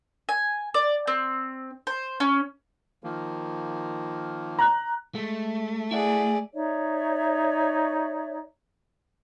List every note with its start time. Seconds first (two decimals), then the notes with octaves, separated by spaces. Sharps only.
0.29 G#5
0.74 D5
1.07 C4
1.87 C5
2.20 C#4
3.04 D#3 F3 A#3
4.59 A#5 F#6
5.15 G#3 A3
5.91 E4 G#4 D5 E5 F#5
6.54 D#4 C#5 D5 E5